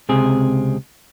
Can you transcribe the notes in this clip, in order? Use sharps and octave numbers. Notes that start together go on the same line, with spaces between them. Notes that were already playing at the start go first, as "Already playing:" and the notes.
C#2 C3 C4 G#4